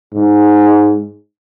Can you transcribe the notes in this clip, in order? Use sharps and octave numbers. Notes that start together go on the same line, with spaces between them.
G#2